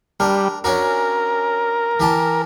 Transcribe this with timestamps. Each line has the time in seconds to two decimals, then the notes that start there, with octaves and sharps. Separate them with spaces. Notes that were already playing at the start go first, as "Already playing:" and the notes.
0.20 G3 D4 A#4
0.64 C#4 D4 F#4 A#4
2.00 E3 G4 A5